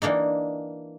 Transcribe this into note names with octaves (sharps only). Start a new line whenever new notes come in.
E3 A#3 D4 D#4